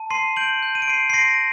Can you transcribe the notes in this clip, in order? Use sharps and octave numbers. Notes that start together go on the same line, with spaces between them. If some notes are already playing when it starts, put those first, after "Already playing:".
Already playing: A5
C6 C7 D#7
G6 D7 F#7
G6
D#7
D7
C6 C7 D#7
C7
C6 A#6 D7